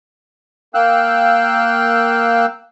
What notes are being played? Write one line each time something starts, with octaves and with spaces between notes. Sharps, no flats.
A#3 F5 G5 E6 F#6